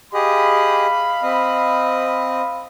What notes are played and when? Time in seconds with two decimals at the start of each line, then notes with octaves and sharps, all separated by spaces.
0.14 G4 G#4 D#5 F5 B5
1.23 C4 D#5